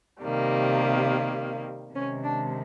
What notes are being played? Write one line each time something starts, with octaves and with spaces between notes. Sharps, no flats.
C3 D#3 G3 A#3
C3 D#3 G#3 C#4
D4